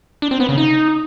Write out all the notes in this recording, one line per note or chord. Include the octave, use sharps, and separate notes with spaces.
D4
C4
B3
C#3
D#4